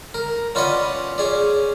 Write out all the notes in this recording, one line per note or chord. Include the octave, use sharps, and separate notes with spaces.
A#4
C#4 F4 B4 D5 D#5 F#5
C#4 G#4 D5